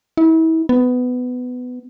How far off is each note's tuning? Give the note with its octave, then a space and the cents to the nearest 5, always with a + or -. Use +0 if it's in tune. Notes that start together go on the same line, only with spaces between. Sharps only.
E4 -35
B3 +15